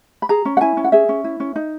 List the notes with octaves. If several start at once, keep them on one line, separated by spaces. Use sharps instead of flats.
B5
G#4 A#5
C#4
F#5
E4 G#5
C#4
F#5
G#4 E5
C#4
E4
C#4
D#4